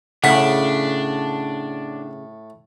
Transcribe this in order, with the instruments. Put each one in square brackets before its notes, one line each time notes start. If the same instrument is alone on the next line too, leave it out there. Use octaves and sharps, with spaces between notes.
[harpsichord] A2 C#6 D#6 [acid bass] C#3 [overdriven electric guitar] D4 [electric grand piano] F#5 B6